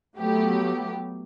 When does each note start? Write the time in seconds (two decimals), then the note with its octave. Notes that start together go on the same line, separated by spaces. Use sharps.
0.19 F#3 A3 B3 G4